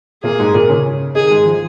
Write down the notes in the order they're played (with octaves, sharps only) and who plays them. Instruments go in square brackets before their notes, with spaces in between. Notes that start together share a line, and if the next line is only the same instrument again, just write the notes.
[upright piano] A#2 A#3 [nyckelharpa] G#4
[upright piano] G#2 G#3
A#2 A#3
C#3 C#4
[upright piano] D#3 D#4 [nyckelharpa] G#4
[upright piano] G#2 G#3
F3